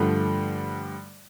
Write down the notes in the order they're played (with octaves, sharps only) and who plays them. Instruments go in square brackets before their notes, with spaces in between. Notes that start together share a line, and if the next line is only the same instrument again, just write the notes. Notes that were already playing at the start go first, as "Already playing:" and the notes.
Already playing: [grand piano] G2 D3 F3 A3